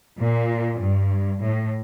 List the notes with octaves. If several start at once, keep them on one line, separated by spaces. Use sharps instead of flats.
A#2
G2
A2